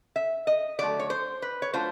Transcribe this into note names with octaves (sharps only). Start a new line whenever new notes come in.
E5
D#5
D3 F#3 A3 D5
C#5
C5
B4
C#5
F#3 A3 D4 F4 C5